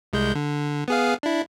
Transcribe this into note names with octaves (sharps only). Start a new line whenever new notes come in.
C2 G#3 G6
D3
B3 G#4 F5
D4 E4